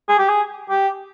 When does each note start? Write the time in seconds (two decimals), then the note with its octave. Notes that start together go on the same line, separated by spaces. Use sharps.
0.09 G#4
0.18 G4
0.29 G#4
0.69 G4